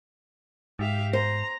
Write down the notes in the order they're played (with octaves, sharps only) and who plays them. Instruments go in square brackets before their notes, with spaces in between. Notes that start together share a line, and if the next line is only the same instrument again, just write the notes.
[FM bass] G#2 [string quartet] G4 E5 F5
[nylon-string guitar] C5 [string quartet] A#5